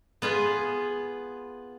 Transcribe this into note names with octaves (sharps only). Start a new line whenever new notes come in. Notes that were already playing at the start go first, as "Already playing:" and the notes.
B3 F4 G#4 B4